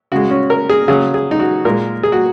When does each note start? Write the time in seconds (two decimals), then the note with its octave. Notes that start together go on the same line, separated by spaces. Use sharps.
0.12 C#3 G#3 F#4
0.31 C#4
0.50 A#4
0.70 G#4
0.88 C#3 F#3 G#4
1.14 G#4
1.31 D#4
1.40 F#4
1.65 A#2 G#3 A#4
2.03 G#4
2.12 F#4